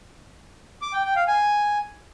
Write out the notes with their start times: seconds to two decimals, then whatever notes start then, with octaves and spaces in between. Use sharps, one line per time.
0.82 D6
0.93 G5
1.05 G5
1.16 F5
1.27 G#5